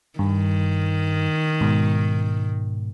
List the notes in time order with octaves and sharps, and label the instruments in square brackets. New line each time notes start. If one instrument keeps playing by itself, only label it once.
[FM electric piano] G2 [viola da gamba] D#3
[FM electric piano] G#2 B2